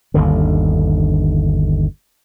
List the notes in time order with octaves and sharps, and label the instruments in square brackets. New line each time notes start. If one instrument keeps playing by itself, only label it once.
[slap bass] G1 D#2 D3